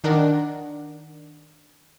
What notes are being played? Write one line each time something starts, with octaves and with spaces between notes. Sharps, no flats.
D#3 D4 A#4 F#5